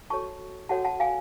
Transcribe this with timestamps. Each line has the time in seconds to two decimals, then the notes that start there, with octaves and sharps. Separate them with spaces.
0.10 F#4 A4 C#5 A5 C#6
0.69 F#4 A4 C#5 F#5 A5
0.85 F#5 A5
1.00 F5 G#5